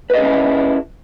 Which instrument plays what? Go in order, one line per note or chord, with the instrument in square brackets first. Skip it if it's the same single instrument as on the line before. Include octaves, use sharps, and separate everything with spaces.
[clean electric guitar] B4
D#5
G#4
C#4
E4